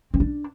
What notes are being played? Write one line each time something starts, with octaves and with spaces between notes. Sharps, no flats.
C4
D4